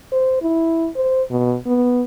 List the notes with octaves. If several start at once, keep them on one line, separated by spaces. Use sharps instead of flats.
C5
E4
C5
B2
B3